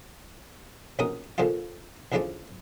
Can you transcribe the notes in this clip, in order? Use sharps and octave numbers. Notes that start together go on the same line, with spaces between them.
A#1 B2 C#4 D#4 A#4 D#6
A#2 D3 F3 G#3 F4
A1 D2 C#3 F3 G#3 D5